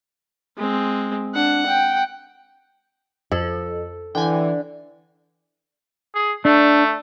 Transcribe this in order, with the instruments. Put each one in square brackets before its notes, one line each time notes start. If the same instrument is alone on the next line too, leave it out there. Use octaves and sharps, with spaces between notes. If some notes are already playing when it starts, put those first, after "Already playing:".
[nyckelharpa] G#3 C4
[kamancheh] D4 [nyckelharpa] F#5
[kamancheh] G5
[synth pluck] F2 [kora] A4
[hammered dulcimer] D3 [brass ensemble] E3 [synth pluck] G5 G#5
[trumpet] G#4
[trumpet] A3 [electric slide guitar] D4